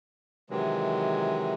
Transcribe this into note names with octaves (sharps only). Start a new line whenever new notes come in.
C3 D#3 E3 F#3 G#3